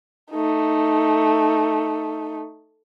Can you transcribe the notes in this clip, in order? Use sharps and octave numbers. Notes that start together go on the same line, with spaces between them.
A3 D#4